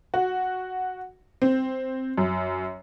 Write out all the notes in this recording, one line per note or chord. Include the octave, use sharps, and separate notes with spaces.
F#4
C4
F#2